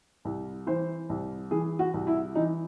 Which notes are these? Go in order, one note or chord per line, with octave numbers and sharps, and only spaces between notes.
C2
E3 C5
C2
E3 G#4
F#4
C2
E4
E3 D#4